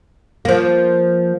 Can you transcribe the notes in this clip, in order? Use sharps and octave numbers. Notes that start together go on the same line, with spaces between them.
F3 A#3